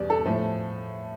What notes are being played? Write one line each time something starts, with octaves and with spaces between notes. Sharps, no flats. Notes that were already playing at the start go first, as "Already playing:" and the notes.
Already playing: E2 B2 G3 D5
A4
A2 F3 A3